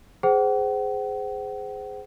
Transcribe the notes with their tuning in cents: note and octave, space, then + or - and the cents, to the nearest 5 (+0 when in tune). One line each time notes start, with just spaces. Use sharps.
G#4 +0 C5 -15 F#5 +40